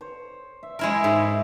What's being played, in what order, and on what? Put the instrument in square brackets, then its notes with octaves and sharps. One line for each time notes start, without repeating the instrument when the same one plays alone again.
[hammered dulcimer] C5 C#5
E5
[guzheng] G#3 E4 A#4
[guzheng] G#2 [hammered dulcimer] E4